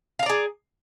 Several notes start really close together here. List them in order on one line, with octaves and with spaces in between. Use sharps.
F5 A#5 D5 G#4